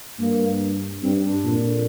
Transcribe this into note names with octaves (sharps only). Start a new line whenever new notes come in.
G2 A#3
G2 C4
D4
F2 A#2